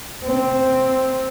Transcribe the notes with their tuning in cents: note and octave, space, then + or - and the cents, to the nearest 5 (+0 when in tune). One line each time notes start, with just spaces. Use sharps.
C4 +0